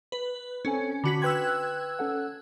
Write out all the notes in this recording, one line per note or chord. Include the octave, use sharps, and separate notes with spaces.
B4
C4 C#4 A4 G#5
D3 F#4 B5 B6
B4 G5 C6 E6 F#6 G#6
C#4 A4 F#5